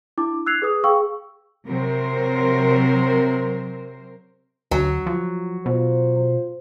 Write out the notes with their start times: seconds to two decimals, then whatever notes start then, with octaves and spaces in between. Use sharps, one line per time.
0.18 D4 E4 D6
0.46 E6 F#6 G#6 C7 F7
0.62 G#4 B4 D#6
0.84 G#4 F5 G5 C#6 E6
1.67 C3 F#3 A#4 C5
4.71 D2 F#3
5.06 F3
5.66 B2 F4 C5